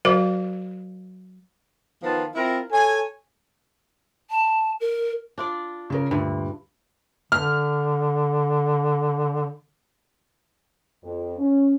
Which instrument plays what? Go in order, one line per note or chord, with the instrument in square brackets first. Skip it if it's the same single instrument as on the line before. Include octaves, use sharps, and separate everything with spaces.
[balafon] F#3 F#4 A#4 C5 F5
[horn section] D#3 F3 B3 F4 A5
C4 E4 F4 A#4
A4 C#5 G#5
[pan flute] A5
A#4
[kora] D4 F4 D5
[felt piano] C#3 C#4 A#4
[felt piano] D2 [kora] G2 A#2
[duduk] D3 [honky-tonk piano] F6
[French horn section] F2
C#4